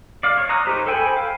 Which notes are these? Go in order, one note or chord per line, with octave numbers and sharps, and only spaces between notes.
D5 F5
C#5
A#5 D#6 F#6
D#4 G4 C5
A4 C5 G5 G#5 B5
F5